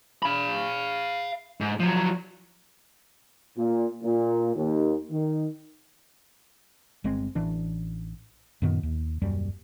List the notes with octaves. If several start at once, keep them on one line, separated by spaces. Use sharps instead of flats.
F5 B5
G#2
F3 F#3
A#2
A#2
D#2
D#3
G1 G#3 C4
A1 E3 D4
F#2 A#2 D#3 B3
D#2
D#1 F#2 G3